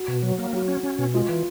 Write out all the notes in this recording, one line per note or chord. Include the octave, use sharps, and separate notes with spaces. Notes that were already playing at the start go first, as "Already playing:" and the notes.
Already playing: F#4
B2
F#3
A#3
F#3 F#4
C#4
C#4
B2
G#3 F4
E3